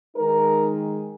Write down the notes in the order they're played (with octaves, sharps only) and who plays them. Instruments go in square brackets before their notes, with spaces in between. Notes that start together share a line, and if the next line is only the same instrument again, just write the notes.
[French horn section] D#3 G#3 D#4 A#4